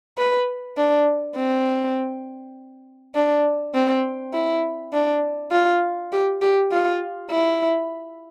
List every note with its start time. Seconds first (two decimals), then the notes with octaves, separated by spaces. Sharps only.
0.18 B4
0.77 D4
1.37 C4
3.15 D4
3.74 C4
4.34 E4
4.93 D4
5.52 F4
6.12 G4
6.42 G4
6.72 F4
7.31 E4